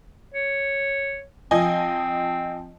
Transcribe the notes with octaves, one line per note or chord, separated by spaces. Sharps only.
C#5
F3 C4 D#5 G#5